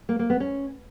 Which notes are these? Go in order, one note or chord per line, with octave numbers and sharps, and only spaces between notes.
A#3
A#3
B3
C#4